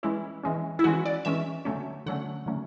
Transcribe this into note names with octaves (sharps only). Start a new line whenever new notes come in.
E3 G#3 C#4 E4
E3 G#3 C#4
E4
E3 G#3 C#4 F#4
D5
E3 G#3 C#4 E5
D3 F#3 A3 C#4
D3 F#3 A3 C#4 F#5
D3 F#3 A3 C#4